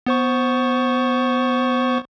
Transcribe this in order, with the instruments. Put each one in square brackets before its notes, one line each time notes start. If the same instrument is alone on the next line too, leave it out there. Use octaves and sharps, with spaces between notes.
[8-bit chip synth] B3 C5 C#6